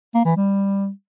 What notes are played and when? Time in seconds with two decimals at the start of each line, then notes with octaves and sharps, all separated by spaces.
0.14 A#3
0.25 E3
0.36 G3